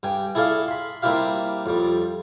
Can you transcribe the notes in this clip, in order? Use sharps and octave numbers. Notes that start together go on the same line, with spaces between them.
G2 G5 G#5
E4 G#4 A4 D5 F5
B5 C6
G3 A#3 C4 E4 G4 F5
F2 G3